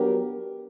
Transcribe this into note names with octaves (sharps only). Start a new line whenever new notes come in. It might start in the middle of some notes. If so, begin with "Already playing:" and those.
Already playing: F#3 B3 D4 G4 A#4